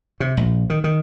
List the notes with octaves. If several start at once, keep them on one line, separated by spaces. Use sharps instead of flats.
C3
A#1
D#3
D#3